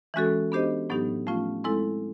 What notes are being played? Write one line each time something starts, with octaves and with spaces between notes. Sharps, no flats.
E3 G#3 C#4 F#4 A4
B3 D4 G4 C5 D#5
A2 F#3 B3 D#4 G4
F3 A3 C#4 F4
G#3 C4 E4 A4